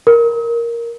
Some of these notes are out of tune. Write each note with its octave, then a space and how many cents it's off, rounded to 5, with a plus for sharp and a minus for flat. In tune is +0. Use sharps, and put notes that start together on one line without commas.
A#4 +0